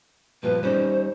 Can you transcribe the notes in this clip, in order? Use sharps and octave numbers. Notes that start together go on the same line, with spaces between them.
G2 A#2 F3 B4
G3 C#4 D#4 C5